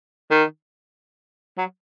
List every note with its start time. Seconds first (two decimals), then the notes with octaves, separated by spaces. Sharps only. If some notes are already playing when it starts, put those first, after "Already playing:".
0.31 D#3
1.57 F#3